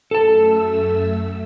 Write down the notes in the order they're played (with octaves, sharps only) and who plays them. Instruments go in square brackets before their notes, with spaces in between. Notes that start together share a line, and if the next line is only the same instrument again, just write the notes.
[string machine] F#2 A3 E6 [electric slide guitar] A4 A5